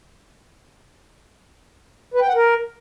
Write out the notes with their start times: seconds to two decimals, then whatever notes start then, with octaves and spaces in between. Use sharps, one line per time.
2.14 B4
2.21 G5
2.28 F#5
2.35 A#4